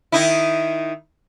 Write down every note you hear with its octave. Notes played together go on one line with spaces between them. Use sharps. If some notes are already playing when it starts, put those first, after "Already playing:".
D#3 D#4 E4